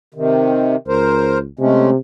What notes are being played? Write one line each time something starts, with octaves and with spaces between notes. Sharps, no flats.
C3 D#3
C#2 A#4 C5
C3 G#3 A3 C#4